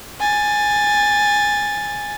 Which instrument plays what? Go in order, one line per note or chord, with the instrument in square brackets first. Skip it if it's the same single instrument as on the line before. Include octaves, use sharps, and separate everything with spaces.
[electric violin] G#5 A6